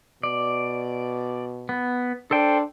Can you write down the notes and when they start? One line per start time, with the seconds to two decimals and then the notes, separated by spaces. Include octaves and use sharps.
0.23 B2 D5
1.69 B3
2.31 D4 A4 C5 G5